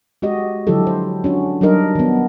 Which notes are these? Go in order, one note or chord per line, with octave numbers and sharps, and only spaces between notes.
G#3 F#4 G4 D#5
D3 F3 F#3 E4 G4 A4
C5
C#4 D4 F#4
F#3 G3 D4 D#4 A#4 D#5
D#3 B3